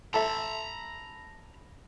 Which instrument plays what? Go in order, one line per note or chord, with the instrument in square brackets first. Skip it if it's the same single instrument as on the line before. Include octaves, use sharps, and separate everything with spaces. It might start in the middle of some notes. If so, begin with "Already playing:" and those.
[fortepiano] A4 E5 [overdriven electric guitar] A#5 B5